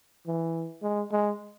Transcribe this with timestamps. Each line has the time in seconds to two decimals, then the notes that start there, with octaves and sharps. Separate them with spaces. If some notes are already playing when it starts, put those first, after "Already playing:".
0.27 E3
0.83 G#3
1.11 G#3